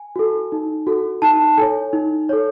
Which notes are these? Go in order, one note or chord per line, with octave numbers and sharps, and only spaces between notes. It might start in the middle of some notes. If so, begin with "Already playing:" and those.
Already playing: G#5
F#4 A4
D#4
F#4 A4
D#4 A5
A4 C#5 G#5
D#4
A4 C#5